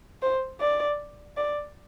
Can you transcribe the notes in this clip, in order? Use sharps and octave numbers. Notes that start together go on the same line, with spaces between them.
C5
D5
D5